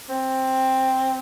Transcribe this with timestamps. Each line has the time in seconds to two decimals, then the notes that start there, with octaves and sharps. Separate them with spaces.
0.09 C4